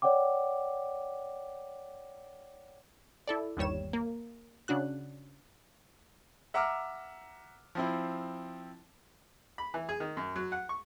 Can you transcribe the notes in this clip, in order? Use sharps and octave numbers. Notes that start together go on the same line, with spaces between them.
C#5 D5 F#5 G5 D6
E4 A4 D5
G1 D#2 G3 C#5 E7
A#3
C#3 D4 F#4 F#6
E5 F#5 A#5 D6 E6 F6
F3 C4 E4
B5
E3
G#4
D#3
F#2
F#3
F#5
C#6